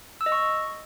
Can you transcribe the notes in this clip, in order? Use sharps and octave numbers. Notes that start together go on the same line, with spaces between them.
E6
D#5
C#6